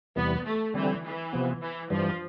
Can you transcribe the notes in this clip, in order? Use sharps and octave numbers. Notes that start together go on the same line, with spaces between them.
E2 C3 E3 G3 B3
A3
D3 E3 G3 C4
E3
C3 F3 B3
E3
G2 E3 F3 G3